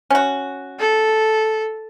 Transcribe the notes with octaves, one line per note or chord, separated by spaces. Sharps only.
C#4 F#4
A4